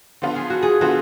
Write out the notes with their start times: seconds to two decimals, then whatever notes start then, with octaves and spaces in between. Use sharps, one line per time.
0.22 D3 F3 B3 F4
0.36 G#4
0.50 F#4
0.62 G#4
0.81 D3 F3 B3 F4 F#4